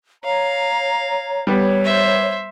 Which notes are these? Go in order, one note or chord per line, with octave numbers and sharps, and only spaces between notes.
C#5 F5 A#5
G3 B3 C#5
C5 E5